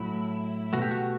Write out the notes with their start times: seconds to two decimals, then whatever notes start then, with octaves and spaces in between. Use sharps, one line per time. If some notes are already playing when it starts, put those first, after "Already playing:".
Already playing: A2 F#3 A3 E4
0.73 B2 A3 F#4
0.82 G4
0.91 F#4